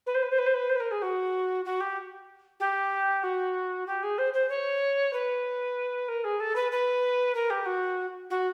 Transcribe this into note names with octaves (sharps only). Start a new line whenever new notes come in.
B4
C5
B4
C5
B4
C5
B4
C5
B4
A#4
G#4
F#4
F#4
G4
G4
F#4
G4
G#4
C5
C5
C#5
B4
A#4
G#4
A4
B4
B4
A#4
G4
F#4
F#4